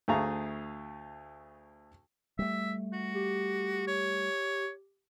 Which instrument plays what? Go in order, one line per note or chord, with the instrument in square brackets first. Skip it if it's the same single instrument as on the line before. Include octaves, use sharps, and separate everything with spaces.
[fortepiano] D2 A3 G#4 F5 A#5 C#6
[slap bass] G3 A3 [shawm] E5
[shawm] F#4
[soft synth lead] G4
[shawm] C#5